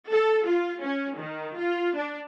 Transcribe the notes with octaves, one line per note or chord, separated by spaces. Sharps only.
A4
F4
C#4
D#3
F4
D4